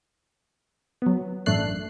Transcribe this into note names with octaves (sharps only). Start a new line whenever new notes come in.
F#3 B3
A1 F#2 A3 D4 F#6 C7